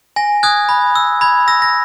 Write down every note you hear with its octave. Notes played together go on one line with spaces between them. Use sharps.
G#5 A#6
D#6 F#6 G#6
B5
E6
B5 G#6
E6 A#6
A#6